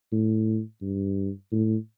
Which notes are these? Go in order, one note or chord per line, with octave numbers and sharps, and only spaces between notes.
A2
G2
A2